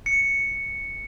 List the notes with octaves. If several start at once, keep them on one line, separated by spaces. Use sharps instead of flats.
C#7